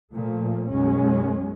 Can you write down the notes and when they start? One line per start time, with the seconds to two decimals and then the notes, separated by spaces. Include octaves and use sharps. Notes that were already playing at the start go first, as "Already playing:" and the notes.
0.13 A#2 F3 A3
0.71 B1 F#2 G#3 C#4